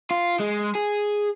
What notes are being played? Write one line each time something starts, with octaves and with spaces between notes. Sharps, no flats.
F4
G#3
G#4